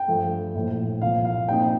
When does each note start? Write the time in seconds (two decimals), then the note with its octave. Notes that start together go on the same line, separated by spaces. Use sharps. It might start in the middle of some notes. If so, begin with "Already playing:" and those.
Already playing: G5
0.08 G2 F3 A3
0.55 A#1 A2 F3
1.02 C2 A#2 F3 F5
1.25 F5
1.48 A#1 A#2 G3 C4 D#4 G5